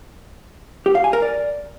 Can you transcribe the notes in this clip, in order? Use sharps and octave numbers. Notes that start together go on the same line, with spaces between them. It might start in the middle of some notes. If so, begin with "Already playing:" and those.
G4
F5
G#5
A#4
D5